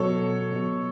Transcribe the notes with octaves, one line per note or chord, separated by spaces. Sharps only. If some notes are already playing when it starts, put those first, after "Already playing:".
Already playing: B2 F#3 A4 C#5
B2 F#3